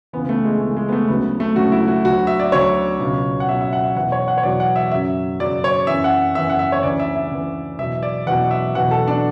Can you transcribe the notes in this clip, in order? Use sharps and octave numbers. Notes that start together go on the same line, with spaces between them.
C#2 C#3 E3 B3
B3
A3
G#3
C#2 C#3 E3 A3
G#3
B3
A3
D2 C#3 F#3 B3
A3
D2 C#3 F#3 F#4
E4
F#4
D2 D3 F#3 F#4
E5
D5
D2 D3 F#3 C#5
C#2 B2 F#3
F#5
C#2 B2 F#3 E5
E5
F#5
E5
E2 B2 F#3 F#5
C#5
F#5
C#5
E2 B2 F#3 D5
F#5
E5
F#2 C#3 F#3 E5
F#2 C#3 F#3 D5
C#5
F#2 E3 E5
F#5
F#2 E3 E5
F#5
E5
C#5
D2 C#3 E3 D5
E5
E5
D2 C#3 E3
E2 B2 F#3 E5
D5
E2 B2 F#3 F#5
E5
E2 B2 F#3 F#5
A4
D4